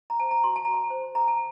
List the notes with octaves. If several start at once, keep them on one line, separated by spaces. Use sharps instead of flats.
A#5
C5 A5
A#5
F#4 C6
A5
F#4 A#5
A5
C5
A4 A#5
A5